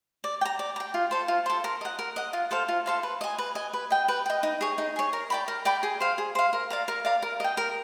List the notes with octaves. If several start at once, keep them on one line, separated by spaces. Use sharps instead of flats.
D5
G5
A#5
D5
A#5
G5
F4
A4 C5
F4
A4 C5
A#4
D#5 F#5
A#4
D#5 F#5
F4
A4 C5 F5
F4
A4 C5 F5
B4
D#5 G#5
B4
D#5 G#5
B4
D#5 G5
B4
D#5 G5
D#4
G#4 C#5
D#4
G#4 C#5
A#4
D5 G5 B5
A#4
D5 G5 B5
G#4
C5 F5
G#4
C5 F5
A#4
D5 F5 A#5
A#4
D5 F5 A#5
A#4
D#5 G5
A#4